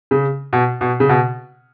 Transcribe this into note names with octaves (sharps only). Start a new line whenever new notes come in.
C#3
B2
B2
C#3
B2